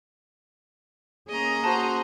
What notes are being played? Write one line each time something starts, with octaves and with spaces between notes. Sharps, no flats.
A#3 C#4 G#4 D#5 A#5
F#4 C5 A5